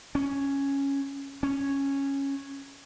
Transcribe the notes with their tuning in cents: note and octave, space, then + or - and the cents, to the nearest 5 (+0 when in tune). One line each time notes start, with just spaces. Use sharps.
C#4 +0
C#4 -5